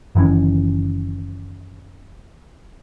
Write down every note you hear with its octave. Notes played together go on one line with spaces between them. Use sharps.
F#1 D#3 E3 C#4